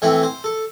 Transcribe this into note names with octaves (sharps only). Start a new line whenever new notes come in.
A2 E3 A3 C4 E5
C5
A4